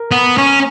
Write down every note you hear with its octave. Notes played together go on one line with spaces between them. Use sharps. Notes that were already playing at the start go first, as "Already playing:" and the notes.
Already playing: A#4
B3
C#4